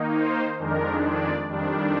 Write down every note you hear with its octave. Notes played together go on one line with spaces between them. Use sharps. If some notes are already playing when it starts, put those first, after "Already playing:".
Already playing: D#3 A#3 D#4
C5
F2 D#3 G#3 D4 A#4
D5
F2 D#3 G3 D4